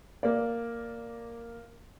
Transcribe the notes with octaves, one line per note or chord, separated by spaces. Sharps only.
A#3 D5